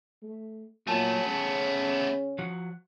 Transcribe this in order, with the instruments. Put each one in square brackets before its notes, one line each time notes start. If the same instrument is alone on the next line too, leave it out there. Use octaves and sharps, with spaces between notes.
[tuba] A3
[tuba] A#2 [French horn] F#3 [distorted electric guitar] A3 B3 [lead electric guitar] G#5 A5
[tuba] C#3 [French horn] C#4
[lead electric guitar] F3 F#4